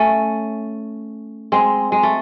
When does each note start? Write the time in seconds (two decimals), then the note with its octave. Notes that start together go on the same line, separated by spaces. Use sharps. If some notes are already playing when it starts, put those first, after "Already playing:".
Already playing: A3 C#4
1.52 G#3 C4
1.92 G#3
2.03 A3